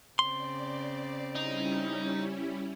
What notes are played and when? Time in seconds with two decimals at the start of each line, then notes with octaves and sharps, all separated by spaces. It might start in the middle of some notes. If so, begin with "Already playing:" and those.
0.19 C#3 C4 D5 C6
1.35 G3 C#4 D#4 E4